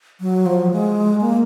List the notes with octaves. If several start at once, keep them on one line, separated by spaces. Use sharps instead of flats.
F#3
F3
G#3
A#3